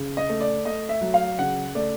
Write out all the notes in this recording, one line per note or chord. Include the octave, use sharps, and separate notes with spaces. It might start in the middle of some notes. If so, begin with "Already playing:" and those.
Already playing: C#3
D#5
A3
D5
A3 D#5
E5
F#3
F5
C#3 F#5
A3 D5